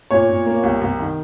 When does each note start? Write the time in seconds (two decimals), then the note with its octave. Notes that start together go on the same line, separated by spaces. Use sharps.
0.10 A#2 C#5
0.29 A#2
0.46 A#3
0.63 C2
0.81 C2
0.99 D#3